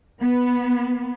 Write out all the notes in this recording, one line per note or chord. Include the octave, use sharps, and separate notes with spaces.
B3